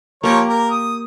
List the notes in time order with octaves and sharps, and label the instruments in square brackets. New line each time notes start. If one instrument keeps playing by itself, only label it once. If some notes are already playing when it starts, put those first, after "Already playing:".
[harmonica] F3 A#4 C#5 [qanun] A#3 G4
[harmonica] A#4
D#6